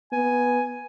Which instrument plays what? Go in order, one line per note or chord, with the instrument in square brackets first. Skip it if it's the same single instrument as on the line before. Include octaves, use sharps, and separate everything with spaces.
[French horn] B3 [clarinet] G#5